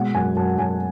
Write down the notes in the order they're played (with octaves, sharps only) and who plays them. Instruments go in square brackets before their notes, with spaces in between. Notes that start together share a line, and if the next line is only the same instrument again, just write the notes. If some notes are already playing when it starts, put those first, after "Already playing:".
Already playing: [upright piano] B2 G#3 F#5
F#2 G#5
F#2 A5
F#2 G#5